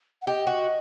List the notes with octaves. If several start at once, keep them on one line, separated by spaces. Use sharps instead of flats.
F#5
G4 D#5
F#4